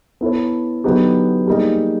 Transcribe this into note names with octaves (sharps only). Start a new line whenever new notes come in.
B3 E4 A4 C#5
D3 F#3 B3 D#4 G4
G3 A#3 D#4 G#4